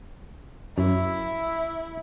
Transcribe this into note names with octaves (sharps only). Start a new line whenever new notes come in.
F#2 E4